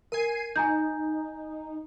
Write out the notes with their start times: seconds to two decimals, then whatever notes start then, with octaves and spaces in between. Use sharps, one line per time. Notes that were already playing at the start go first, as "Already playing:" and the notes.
0.12 A#4 G#5 C7 D#7
0.56 D#4 G#5 A#5 G6